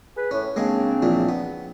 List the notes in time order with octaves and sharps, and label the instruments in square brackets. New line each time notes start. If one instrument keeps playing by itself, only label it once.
[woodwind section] G#4 B4
[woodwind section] A2 [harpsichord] C#4
[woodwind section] C#3 C4 D4 [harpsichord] G#3 A#3 G#4
[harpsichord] A#1 A#2 E3
B3